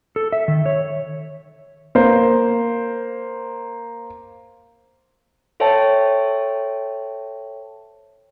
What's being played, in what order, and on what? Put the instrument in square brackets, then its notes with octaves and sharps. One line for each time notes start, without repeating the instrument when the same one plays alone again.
[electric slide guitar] A4
E5
D#3
C#5
[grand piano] A#3 C5
[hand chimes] A4 C5 C#5 E5 G5 A5